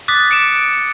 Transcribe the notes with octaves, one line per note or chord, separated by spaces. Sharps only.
D6 D#6 F#6 A6 B6
C#7 D7 E7